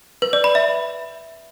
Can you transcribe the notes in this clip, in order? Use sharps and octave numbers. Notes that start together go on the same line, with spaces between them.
B4
D5
B5
E5